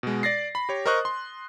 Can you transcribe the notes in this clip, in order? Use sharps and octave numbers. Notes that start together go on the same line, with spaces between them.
B2 G#3
D5 A6 A#6 C7
B5
G4 C#5
A#4 C5 D#5 C#6 D#6 F#6
C6